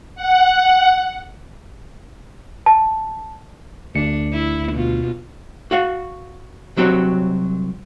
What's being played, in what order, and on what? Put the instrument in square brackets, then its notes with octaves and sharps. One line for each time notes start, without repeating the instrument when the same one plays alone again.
[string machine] F#5
[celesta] A5
[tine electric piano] D2 C#7 [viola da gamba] D4
[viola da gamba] E4
B2 F4
[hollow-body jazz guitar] F#4 F5 F#5
C2 F#3 C4 F#4 G4 C#5